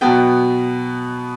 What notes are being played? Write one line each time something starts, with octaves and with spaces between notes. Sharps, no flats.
B2 F#3 B3 G5